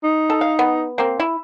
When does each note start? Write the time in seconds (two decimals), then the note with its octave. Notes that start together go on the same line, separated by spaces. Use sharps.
0.04 D#4
0.30 A4
0.41 F5
0.59 B3
0.98 A#3 C4
1.20 E4